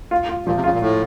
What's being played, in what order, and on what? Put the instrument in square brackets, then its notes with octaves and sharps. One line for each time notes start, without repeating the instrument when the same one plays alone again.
[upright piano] F4
F4
[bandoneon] A#2 [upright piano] F3
[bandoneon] C3
[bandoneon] C#3 [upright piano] F4
[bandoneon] A#2
A2